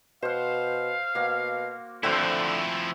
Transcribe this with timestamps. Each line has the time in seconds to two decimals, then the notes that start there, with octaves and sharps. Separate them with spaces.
0.22 B2 C5 F5 F#5
1.15 B2 A#3 F#4
2.03 D3 F3 A3 C4 E4 F#4